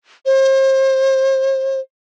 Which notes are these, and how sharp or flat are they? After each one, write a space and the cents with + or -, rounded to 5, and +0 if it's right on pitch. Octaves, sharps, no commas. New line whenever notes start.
C5 +35